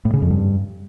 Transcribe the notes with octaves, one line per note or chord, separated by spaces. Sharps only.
A2
C#3
F2
G2